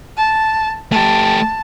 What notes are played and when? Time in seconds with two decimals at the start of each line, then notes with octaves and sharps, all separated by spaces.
0.17 A5
0.92 A3 G4 A5